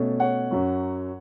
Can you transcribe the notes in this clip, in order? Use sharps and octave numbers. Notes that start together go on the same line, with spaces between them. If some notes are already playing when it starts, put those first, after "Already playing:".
Already playing: B2 A3 C#4
C#5 F#5
F#2 F#3 C#4